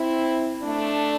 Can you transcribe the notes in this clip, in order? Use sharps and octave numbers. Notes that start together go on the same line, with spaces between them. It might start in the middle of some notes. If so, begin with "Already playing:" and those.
Already playing: C4 E4
A3 D4